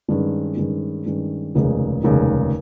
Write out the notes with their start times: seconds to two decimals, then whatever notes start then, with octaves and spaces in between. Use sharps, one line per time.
0.08 G2 D#3 G#3 C#4
0.57 G2 D#3 G#3 C#4
1.06 G2 D#3 G#3 C#4
1.55 F1 D#2 C#3 G#3 D#4
2.03 F1 D#2 C#3 G#3 D#4